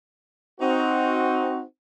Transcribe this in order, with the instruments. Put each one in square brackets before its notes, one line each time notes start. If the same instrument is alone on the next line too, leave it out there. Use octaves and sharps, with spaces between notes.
[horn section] C4 D#4 F#4